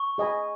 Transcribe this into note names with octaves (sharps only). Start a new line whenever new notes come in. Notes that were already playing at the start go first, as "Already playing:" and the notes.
Already playing: C#6
G#4 D#5 G#5 B5